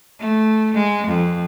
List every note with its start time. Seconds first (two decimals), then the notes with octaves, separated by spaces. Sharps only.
0.19 A3
0.75 G#3
1.08 F2